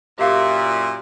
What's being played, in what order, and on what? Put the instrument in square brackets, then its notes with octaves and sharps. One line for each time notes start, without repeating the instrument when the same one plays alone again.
[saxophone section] F#2 A#2 [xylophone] G4 F5 [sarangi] E5